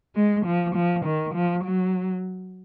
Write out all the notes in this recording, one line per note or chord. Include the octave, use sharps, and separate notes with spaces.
G#3
F3
F3
D#3
F3
F#3